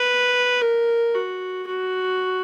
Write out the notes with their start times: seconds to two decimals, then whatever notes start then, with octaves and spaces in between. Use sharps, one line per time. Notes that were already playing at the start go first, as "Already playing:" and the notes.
Already playing: B4
0.61 A#4
1.14 F#4
1.67 F#4